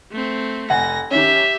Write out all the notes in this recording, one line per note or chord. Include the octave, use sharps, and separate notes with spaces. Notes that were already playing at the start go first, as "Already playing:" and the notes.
A3 C4
F1 F#5 G#5 A#6
D#3 C#4 G4 E5